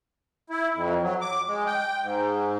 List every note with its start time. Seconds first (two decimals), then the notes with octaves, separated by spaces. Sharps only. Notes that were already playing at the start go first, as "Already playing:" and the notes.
0.50 E4
0.75 F2
1.02 F#3
1.21 D6
1.47 G#3
1.66 G5
2.02 G#2